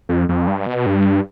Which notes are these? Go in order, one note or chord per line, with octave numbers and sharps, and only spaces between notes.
F2
F2
G2
B2
G2